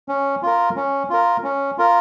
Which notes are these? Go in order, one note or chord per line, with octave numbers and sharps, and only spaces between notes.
C#4
F4 A#4
C#4
F4 A#4
C#4
F4 A#4